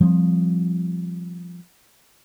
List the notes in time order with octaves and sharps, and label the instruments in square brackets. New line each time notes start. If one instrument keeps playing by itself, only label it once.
[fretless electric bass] F3 G3 C4